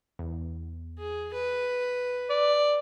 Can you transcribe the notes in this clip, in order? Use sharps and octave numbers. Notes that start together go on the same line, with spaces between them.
E2
G#4
B4
D5